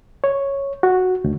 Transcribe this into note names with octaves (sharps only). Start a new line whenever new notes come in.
C#5
F#4
D2